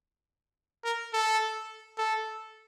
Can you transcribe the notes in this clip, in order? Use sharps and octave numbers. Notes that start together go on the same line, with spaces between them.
A#4
A4
A4